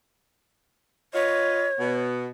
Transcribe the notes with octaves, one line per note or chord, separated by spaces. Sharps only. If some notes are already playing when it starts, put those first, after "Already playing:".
F4 B4 C#5 D#5
B2 B3